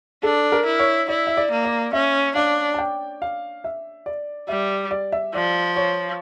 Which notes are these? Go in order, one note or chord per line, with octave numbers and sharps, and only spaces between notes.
D4 A4
A#4
E4
C#5
E4 D5
E5
D5
A#3
D5
C#4 E5
D4 F5
A5
G5
F5
E5
D5
G3 E5
D5
E5
F3 D5
C#5